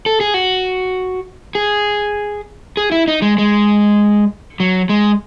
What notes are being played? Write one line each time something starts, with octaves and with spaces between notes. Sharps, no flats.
A4
G#4
F#4
G#4
G#4
E4
D#4
G#3
G#3
F#3
G#3